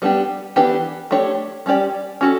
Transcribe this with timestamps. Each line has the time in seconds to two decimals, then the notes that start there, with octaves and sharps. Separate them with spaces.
0.02 G3 B3 D4 G4
0.56 E3 B3 D4 G4 B4
1.11 A3 D4 G4 C#5
1.66 G3 C#4 G4 D5
2.21 C#4 F#4 A4